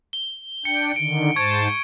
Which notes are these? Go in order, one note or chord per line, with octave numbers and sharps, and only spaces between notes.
G7
D4 G5 C#7
D3 D#3 D7
G#2 C5 A5 C#6 G#6 D7